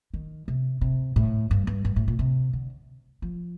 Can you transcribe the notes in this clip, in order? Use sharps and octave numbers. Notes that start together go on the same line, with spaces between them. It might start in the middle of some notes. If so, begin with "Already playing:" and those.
D#3
C3
C3
A2
G2
G2
G2
A2
A#2
C3
D3
F3